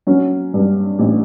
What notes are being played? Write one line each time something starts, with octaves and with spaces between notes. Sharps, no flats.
F#3 C#4
G2
A1